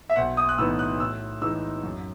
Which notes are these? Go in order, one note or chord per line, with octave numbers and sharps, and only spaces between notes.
E5
B1 F#5
D#6
F#6
A2 E3 B3 D#4 E6
F#6
A2 E6
E3 G#3 D#4 E6
F#2